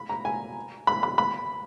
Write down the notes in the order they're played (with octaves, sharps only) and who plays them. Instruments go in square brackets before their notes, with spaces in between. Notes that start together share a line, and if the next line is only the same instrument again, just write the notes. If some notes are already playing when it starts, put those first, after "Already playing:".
Already playing: [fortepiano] B5
A#5
G#5
B5
B5
B5